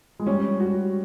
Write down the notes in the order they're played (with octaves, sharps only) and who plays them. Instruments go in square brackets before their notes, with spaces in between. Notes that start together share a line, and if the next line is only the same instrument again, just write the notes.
[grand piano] G#3
[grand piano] G3 [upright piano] C#4
[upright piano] F#4